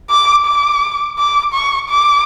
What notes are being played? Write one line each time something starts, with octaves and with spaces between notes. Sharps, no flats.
D6
D6
D6
C#6
D6